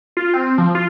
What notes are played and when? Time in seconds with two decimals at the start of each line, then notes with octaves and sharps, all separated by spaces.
0.17 F4
0.34 C4
0.58 F3
0.75 F4